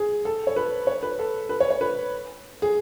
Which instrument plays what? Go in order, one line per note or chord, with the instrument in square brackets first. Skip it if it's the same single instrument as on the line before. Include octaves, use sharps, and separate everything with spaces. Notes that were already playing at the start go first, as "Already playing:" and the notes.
Already playing: [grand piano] G#4
A4
C#5
B4
C#5
B4
A4
B4
C#5
C#5
B4
G#4